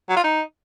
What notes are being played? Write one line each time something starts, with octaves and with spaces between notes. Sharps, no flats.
F#3
F4
D#4